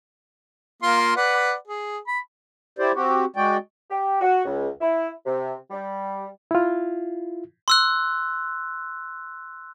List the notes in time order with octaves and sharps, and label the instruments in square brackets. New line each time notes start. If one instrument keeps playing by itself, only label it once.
[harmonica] A#3 F4 C6
B4 D5 F#5
G#4
B5
[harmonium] E4 G4 C5 D5
C4 F#4 G4
G#3 F#4 D5 G5
[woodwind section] G4
F#4
C#2
E4
C3
G3
[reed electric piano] E4 F4
[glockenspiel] C6 E6 F#6